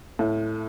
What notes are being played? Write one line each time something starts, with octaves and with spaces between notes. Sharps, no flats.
A2